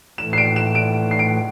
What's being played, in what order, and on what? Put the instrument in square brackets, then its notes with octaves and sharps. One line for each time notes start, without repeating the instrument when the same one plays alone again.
[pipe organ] A2 E3 A3 [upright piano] E7
[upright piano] C7
D7
E7
D7
C7
D7